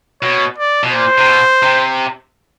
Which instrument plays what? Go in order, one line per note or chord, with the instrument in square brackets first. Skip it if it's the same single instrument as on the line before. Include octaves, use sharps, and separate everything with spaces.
[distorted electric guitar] B2 [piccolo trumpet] C#5
[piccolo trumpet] D5
[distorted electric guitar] B2
[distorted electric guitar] A#2 [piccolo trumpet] C5
[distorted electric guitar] C3
B2
C3